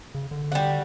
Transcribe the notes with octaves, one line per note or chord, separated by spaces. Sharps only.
C#3
D3
G3 F#4